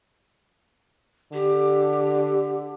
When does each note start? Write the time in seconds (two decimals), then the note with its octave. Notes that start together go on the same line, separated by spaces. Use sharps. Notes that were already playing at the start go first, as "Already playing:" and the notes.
1.33 D3 G4